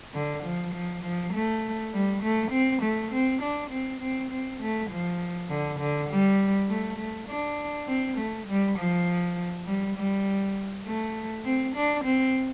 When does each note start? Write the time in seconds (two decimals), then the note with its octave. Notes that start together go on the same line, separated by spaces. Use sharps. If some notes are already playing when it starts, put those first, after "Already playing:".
0.14 D3
0.43 F3
0.74 F3
1.03 F3
1.33 A3
1.93 G3
2.23 A3
2.52 C4
2.82 A3
3.12 C4
3.42 D4
3.71 C4
4.01 C4
4.31 C4
4.61 A3
4.90 F3
5.49 D3
5.80 D3
6.10 G3
6.70 A3
6.98 A3
7.29 D4
7.88 C4
8.17 A3
8.47 G3
8.78 F3
9.66 G3
9.97 G3
10.86 A3
11.45 C4
11.76 D4
12.05 C4